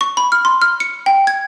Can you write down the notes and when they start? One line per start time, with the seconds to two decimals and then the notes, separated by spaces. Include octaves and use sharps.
0.01 C#6
0.17 B5
0.32 F6
0.45 C6
0.62 F6
0.80 C#7
1.06 G5
1.27 G#6